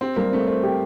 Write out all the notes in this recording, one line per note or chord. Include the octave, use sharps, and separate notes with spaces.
C4 G4
G3 A#3
A3 C4
A3 C5
G4